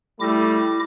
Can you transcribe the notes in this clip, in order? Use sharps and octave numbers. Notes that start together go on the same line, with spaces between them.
G3 A3 E4 D6 A#6